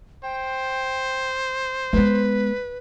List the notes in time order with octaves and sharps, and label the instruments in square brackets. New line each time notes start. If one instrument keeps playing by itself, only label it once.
[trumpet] C5 [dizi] G5
[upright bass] G#3 B3 [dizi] B4